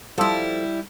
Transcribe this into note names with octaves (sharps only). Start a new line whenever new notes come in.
F3 G3 E4 A4